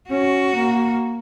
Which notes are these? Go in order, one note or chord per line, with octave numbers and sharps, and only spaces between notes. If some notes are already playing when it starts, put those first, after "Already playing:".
C#4 F#4
A#3